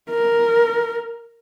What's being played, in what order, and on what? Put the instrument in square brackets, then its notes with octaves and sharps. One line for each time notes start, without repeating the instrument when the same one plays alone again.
[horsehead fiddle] A#4